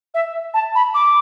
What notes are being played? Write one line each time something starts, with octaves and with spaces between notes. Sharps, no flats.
E5
A5
B5
D6